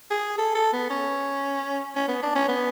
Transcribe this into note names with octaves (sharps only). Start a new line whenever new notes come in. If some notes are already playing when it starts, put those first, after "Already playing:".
G#4
A4
A4
B3
C#4
C#4
B3
D4
C#4
B3